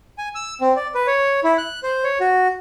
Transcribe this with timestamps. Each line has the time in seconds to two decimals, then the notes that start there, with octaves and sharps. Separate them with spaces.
0.18 G#5
0.35 E6
0.61 C4
0.76 D5
0.95 B4
1.07 C#5
1.44 E4
1.58 F#6
1.83 C5
2.04 C#5
2.20 F#4